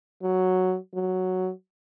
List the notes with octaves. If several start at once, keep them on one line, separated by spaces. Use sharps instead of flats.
F#3
F#3